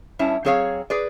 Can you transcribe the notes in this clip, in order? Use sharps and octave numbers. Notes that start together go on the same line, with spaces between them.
G2 C#4 E4 A5
F#3 C4 G#4 C#5 D#5 F5
G#4 B4 D5